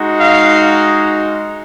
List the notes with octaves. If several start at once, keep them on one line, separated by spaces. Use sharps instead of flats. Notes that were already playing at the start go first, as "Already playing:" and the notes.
Already playing: G#3 D#4 F#4
F5